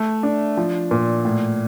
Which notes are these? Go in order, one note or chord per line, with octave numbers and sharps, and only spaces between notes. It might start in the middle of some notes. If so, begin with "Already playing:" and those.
Already playing: A3
D4
F3
A#2
A2